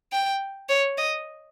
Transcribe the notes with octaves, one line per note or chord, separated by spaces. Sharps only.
G5
C#5
D#5